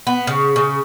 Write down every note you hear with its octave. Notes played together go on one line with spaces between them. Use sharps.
B3
C#3
C#3